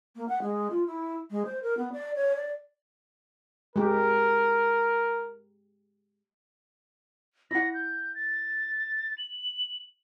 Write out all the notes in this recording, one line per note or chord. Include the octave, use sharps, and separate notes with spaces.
A#3
F#5
G#3
F4
E4
G#3
C5
A#4
B3
D5
C#5
D5
G#3 G4 A#4
E4 F#5 A#6
G6
A6
F#7